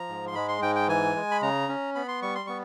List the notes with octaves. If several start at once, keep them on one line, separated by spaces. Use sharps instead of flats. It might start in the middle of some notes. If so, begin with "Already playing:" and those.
Already playing: F3 A#5
G#2
C6
G#3 B5
C6
G#2 G5
G5
E3 G#5
G#3
B5
C#3 A#5
C#4
B3 B5
C6
G3 C#6
C6
B3 C#6